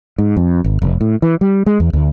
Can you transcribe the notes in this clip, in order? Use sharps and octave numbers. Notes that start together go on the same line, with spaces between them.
G#2
F2
G#1
F1
A2
E3
G3
G#3
E2
D2